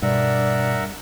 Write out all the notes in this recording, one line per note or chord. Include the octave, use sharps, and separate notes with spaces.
G2 B2 A#4 D5 E5 F#5